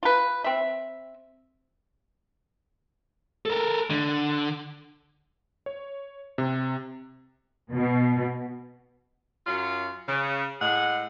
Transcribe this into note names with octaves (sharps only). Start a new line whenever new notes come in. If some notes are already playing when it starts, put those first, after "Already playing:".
F4 B4
C4 E5
A4 A#4
D3
C#5
C3
B2
F#2 F#3 F4
C#3
A2 G#3 G#4 F#5